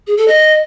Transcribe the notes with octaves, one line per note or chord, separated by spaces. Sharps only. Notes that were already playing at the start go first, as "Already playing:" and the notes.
G#4
A4
D#5